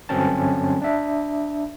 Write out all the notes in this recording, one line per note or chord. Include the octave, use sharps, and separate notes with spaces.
G2 D3 F#3 C4 C#4 A5
D4 E5